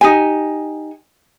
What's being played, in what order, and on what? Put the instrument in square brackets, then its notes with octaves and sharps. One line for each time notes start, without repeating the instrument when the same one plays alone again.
[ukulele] D#4 G4 G#5